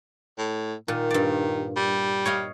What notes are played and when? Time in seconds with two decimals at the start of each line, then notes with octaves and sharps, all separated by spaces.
0.38 A2
0.88 A#2 D#3
1.11 G2 D5
1.76 G3
2.25 C#5 D#5 F5